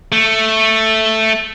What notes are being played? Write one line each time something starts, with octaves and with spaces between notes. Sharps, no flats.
A3